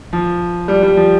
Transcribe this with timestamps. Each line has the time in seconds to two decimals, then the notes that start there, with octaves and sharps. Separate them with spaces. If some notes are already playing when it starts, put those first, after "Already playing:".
0.13 F3
0.68 G3
0.83 G3
0.97 F3